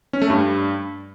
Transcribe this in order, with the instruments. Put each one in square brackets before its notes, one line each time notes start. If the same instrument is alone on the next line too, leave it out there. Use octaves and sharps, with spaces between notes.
[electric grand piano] C#4
A3
G2